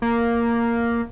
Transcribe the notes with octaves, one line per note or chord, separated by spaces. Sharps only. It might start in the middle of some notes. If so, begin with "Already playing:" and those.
A#3